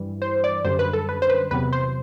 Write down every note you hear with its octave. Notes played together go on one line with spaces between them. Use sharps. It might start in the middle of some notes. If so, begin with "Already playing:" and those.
Already playing: G2 E3 G3
C5
D5
F#2 D3 G3 C5
B4
A4
B4
C5
B4
E2 C3 F#3 B4
C5